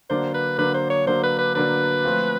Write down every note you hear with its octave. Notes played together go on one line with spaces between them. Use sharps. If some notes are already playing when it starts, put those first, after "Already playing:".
D3 F#3 A#3 D4 C5
B4
D3 F#3 A#3 D4 B4
C5
C#5
D3 F#3 A#3 D4 C5
B4
B4
D3 F#3 A#3 D4 B4
F3 A3 C4 F4